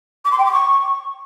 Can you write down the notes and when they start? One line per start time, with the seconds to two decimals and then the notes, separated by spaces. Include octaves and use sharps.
0.25 D6
0.32 C6
0.39 G5
0.45 D6
0.52 C#6